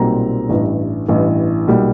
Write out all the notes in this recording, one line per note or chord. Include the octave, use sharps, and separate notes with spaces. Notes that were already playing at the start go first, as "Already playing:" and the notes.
Already playing: B1 A#2 G3 C4 A#5
A1 G2 E3
A1 G2 E3
B1 A#2 G3